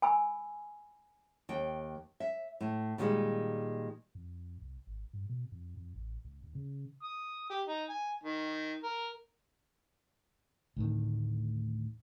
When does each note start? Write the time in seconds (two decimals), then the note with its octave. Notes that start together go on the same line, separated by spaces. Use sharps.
0.02 G#5 B5 E6
1.49 D#2 G5
2.20 E5
2.61 A2
2.98 A#2 D3 D#3 G3 G#3
4.15 F2
4.62 C2
4.87 G#1
5.13 G2
5.29 B2
5.52 F2
5.77 F2
5.95 A1
6.25 C#2
6.44 D#2
6.55 C#3
7.03 D#6
7.50 G4
7.67 D#4
7.90 G#5
8.24 D#3
8.84 A#4
10.77 D2 A2 D#3